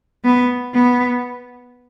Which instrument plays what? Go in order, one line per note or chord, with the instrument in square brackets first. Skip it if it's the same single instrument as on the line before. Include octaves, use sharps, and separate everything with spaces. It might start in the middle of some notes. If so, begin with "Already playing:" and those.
[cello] B3
B3